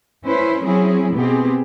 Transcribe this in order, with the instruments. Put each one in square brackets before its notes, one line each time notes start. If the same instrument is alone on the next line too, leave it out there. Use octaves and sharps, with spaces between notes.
[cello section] C#4 E4 B4 C5
F#3 C4 C#4 E4 G#4
B2 B3 C4 G4 G#4